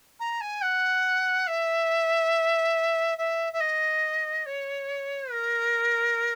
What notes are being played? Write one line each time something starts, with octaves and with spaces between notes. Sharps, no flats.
A#5
G#5
F#5
E5
E5
E5
D#5
C#5
A#4